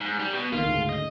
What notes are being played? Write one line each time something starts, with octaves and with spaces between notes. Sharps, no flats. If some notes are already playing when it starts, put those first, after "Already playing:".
G#2
G3
B2
D2 D#3 A#3 F4
D2 G#2 C#3
D#5